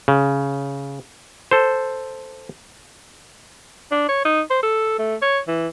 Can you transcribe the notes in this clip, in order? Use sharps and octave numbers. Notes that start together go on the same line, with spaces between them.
C#3
A4 C5
D4
C#5
D#4
C5
A4
A3
C#5
E3